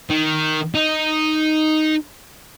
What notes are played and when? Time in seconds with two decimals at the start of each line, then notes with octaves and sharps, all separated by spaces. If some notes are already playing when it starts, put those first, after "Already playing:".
0.10 D#3
0.75 D#4